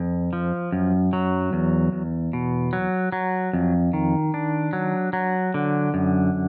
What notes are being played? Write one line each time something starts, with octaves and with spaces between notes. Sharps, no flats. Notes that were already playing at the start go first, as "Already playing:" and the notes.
Already playing: F2
F3
F#2
F#3
E2
E2
B2
F#3
F#3
F2
D#3
D4
F#3
F#3
D3
F#2